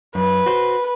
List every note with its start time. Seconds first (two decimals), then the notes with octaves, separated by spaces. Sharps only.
0.15 F#2 B4
0.46 F#4 C5